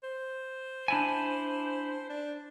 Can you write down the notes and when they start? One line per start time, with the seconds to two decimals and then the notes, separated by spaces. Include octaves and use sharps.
0.03 C5
0.88 D4 E4 G#5
2.09 D4